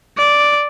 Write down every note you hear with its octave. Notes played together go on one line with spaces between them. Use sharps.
D5